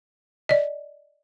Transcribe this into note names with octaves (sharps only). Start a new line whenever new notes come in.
D5 D#5